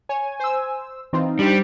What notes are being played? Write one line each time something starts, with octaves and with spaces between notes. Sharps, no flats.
C#5 G#5
C5 E6
E3 C4 D#4 F4
G3 D4 G4 C5